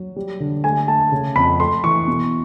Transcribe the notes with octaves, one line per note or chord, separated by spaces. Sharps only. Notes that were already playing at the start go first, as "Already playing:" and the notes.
Already playing: F#3
G3
D3
A3 G#5
A3 A5
C#3
F2 B5
A3 C6
E3 C#6
B2